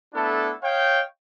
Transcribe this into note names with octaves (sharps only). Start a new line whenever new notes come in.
A3 B3 D4 E4 A4
C#5 D#5 F5 G5